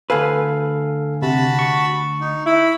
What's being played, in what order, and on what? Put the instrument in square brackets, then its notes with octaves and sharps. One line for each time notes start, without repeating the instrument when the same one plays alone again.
[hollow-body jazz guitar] D2 B4 [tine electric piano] A4 F5 G#5
[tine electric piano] C3 [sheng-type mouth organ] F#4 A5 B5
[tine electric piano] C#6
[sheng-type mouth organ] D#4
[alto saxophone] E4 [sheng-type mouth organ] B5